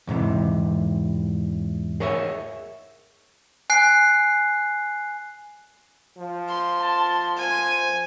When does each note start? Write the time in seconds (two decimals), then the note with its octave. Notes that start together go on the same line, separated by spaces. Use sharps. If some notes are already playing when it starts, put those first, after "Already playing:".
0.07 E2 G#2 C3 E3
2.00 G#4 A#4 C#5 D#5 E5
3.70 G#5 F#6 C7
6.17 F3
6.48 C6
6.81 A5
7.37 C5 G#5